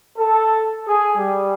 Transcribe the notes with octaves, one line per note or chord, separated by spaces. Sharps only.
A4
G#4
G3